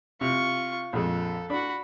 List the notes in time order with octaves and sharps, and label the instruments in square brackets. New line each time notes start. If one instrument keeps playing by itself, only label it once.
[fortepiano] C3 [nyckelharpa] F4 C#6
[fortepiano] A#1 F2 G#3 [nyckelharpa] A4
[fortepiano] D4 [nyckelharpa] F#4 B5